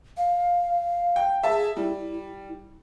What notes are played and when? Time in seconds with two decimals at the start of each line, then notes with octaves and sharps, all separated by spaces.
0.17 F5
1.16 G5
1.43 G#4 E5 A5
1.77 G3 E4